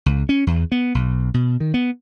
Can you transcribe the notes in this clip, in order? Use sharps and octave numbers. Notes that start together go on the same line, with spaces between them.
C#2
C#4
E2
B3
B1
B2
D#3
B3